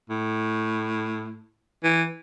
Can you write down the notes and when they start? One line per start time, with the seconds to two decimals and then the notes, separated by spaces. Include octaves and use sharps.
0.10 A2
1.84 E3